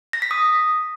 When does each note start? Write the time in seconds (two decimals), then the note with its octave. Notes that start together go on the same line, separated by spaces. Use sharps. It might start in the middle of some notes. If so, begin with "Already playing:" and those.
0.13 A#6
0.22 B6
0.31 D#6